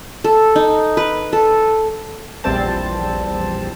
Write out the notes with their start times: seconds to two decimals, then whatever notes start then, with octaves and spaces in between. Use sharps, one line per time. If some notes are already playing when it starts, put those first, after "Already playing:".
0.24 A4
0.56 D#4
0.97 B4
1.33 A4
2.44 A#1 E2 G3 C4 C5 A5